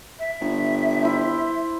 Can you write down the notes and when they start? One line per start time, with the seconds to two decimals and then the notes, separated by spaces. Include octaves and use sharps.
0.19 E5
0.41 G1
1.03 E4 C5